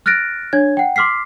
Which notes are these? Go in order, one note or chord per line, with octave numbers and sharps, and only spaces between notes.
F6 F#6 A6 A#6 D7
D4 C#5 G#6
F#5 G5
C6 D6 F6 B6 C7